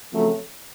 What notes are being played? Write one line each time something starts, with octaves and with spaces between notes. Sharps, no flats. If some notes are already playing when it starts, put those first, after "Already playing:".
F2 C#3 F#3 A3